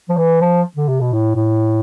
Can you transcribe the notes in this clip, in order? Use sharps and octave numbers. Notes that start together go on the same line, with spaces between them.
F3
E3
F3
D3
C3
B2
A2
A2